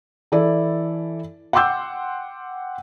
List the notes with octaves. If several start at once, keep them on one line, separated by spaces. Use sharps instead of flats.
E3 E4 A4 D5
F#5 G5 C6 D6 E6 G6